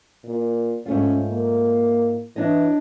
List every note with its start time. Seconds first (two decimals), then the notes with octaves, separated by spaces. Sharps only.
0.25 A#2
0.86 G#2 A3 C#4 F4
1.28 A#3
2.36 E3 D4 C#5 D#5